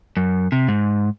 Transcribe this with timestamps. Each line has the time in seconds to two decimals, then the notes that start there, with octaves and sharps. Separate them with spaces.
0.17 F#2
0.52 C3
0.68 G#2